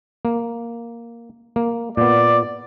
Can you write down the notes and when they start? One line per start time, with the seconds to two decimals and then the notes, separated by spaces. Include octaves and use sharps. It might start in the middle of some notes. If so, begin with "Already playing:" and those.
0.25 A#3
1.56 A#3
1.97 A#2 B3 D5